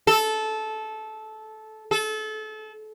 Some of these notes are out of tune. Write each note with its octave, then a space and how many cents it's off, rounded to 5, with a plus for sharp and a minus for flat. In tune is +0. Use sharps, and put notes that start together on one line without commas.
A4 -15
A4 -30